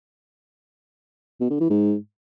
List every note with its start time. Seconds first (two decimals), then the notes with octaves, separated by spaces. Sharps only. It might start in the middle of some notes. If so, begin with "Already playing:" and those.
1.41 B2
1.50 D3
1.60 E3
1.70 G#2